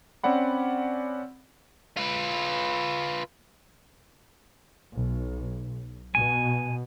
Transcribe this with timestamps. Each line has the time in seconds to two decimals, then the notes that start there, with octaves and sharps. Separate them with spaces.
0.23 C4 C#4 D5 F#5 B5
1.97 F4 B4
4.95 B1
6.15 B2 G#5